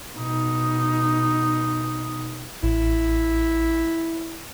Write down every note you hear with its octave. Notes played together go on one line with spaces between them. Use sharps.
B2 D#4
A1 E4